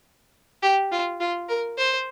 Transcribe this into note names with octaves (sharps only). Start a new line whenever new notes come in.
G4
F4
F4
A#4
C5